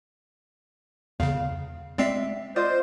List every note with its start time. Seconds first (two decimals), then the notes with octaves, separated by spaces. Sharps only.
1.20 E2 C#3 F5
1.98 G#3 C4 D5 E5 C7
2.56 F4 C5 D5 D#5